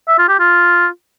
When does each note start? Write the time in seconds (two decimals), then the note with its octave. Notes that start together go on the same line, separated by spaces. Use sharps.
0.08 E5
0.18 F4
0.29 G4
0.39 F4